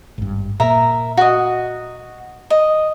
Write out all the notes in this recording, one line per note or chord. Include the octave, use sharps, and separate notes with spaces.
G#1 G2
A#2 A#3 A#4 E5 A#5
F#4 D#5
D#5